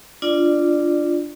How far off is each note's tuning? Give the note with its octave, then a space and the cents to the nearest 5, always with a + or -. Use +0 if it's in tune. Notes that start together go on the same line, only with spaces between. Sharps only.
D4 +0 F4 -15 D5 +20